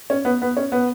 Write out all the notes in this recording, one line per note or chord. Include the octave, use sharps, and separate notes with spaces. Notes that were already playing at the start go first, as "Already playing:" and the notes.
C#4
B3
B3
C#4
B3